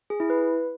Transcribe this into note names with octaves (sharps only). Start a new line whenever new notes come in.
G#4
E4
B4